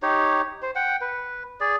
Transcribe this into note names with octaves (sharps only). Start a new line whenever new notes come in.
D#4 G4 C#5
C5
F#5 G5
B4
G#4 D5